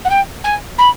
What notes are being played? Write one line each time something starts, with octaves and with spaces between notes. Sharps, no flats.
F#5
G5
G#5
B5